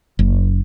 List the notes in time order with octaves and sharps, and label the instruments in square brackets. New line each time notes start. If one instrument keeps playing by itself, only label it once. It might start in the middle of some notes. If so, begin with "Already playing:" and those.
[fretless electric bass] F#1